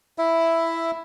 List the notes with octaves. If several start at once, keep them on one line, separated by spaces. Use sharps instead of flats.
E4 E5